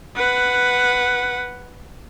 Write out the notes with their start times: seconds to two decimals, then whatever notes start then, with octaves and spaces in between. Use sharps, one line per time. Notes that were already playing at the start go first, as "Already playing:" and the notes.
0.16 B4 F#5